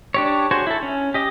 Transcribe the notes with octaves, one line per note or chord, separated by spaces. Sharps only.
D4 G4 C#5
F#4 G#4 C5 C#5
E4 A4
C#4
G4 D#5